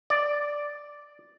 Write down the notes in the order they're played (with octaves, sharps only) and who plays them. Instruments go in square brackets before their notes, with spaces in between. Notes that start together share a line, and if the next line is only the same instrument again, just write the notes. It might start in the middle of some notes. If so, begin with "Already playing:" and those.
[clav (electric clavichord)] D5